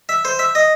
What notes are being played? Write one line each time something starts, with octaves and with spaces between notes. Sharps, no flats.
E5
C5
E5
D#5